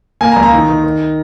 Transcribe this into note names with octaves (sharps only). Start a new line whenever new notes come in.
A#3 G#5
A#5
C#2
A#5
D#3
D#3
D#3